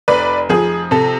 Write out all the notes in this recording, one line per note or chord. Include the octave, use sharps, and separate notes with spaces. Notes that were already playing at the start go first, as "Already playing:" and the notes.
F1 B4 D5
F3 G#4
C3 A4